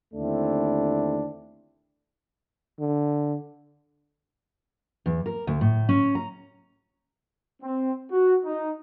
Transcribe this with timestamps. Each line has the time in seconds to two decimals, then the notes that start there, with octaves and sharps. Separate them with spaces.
0.14 D#2 D3 A3 C4 D4 E4
2.80 D3
5.06 E2
5.26 A#4
5.47 D2
5.61 A2
5.89 C#4
6.15 A#5
7.62 C4
8.10 F#4
8.45 D#4